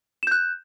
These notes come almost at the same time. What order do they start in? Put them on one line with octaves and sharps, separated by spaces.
E7 G6 F#6